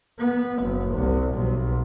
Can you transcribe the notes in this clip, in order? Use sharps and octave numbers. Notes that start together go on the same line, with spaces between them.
B3
F#1
C2
B1